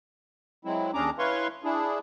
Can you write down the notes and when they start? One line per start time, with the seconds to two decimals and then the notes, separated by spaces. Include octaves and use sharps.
0.65 F#3 G#3 C4 E4
0.94 D#2 C#4 D4 G#4 A#5 D6
1.19 E4 B4 C#5 F5 C6 C#6
1.64 D4 E4 G#4